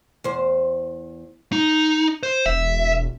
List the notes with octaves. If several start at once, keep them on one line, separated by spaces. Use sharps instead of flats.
E2 C5
D#4
C5
E1 E5